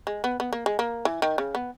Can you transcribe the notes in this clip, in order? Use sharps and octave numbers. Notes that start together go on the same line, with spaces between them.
G#3
B3
B3
A#3
G#3
A#3
E3
D#3
C#3
B3